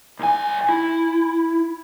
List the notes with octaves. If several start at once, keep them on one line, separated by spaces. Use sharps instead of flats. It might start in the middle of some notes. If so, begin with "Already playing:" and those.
C2 G#5
E4